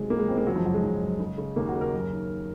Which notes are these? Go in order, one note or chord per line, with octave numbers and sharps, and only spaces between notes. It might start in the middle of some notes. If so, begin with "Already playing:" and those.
Already playing: C3 D#3 F#3 G#3
C#2 A#3
G#3
C#2 C4
A#3
F#2 F#3
F3
F#1 F#3
G#3
F3
F#2
C#3
C#3
D#2 A#3
F#4
C#3
A#4
F#2
D#3
D#3